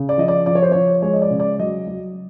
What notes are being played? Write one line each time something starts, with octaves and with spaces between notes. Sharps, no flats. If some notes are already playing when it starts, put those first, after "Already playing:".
Already playing: C#3
D5
F3 D#5
D5
F3 D5
C#5
C5
F3 C#5
G#3 C#5
D#5
D5
C#3
D5
F#3 D#5
F#3